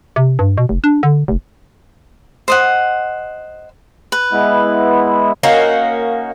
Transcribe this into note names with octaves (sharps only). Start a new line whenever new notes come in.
C3
G2
B2
F1
D4
D3
F1
C5 D#5 F#5
B4
G#3 B3 E4
A#3 C#4 D#4 F#4